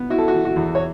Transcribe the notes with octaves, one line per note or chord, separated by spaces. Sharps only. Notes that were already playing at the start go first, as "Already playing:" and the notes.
Already playing: B3
E4 F#4
A4
F#4
E3
F#4
E2
C#5